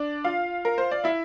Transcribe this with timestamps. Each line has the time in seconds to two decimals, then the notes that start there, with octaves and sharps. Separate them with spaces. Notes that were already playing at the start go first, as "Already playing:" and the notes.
Already playing: D4 D5
0.24 F4 F5
0.65 A#4
0.78 C5
0.91 D5
1.04 E4 E5